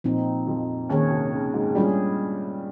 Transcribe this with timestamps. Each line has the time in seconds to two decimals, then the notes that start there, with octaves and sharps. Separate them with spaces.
0.04 A#2 F3 C4 D#4
0.47 F2 F3
0.89 D#2 D#3 A#3 C#4 G#4 C#5
1.11 C3
1.32 C#3
1.54 G#2 G#3
1.75 G2 G3 G#3 C#4 F4 G#4